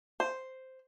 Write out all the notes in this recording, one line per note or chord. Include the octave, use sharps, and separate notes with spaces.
C5